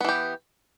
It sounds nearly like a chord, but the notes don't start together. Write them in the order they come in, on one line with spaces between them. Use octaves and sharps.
B3 E3 G4